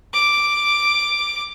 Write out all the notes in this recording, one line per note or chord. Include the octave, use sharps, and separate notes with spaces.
D6